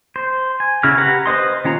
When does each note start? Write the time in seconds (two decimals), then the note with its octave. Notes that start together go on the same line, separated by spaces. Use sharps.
0.16 C5
0.60 G#5
0.83 C#3 E4 F#4 F6
0.97 G4 B4 F#5 A#5
1.26 B4 C5 D#5 C6
1.65 D#3 C#4 F4 A#5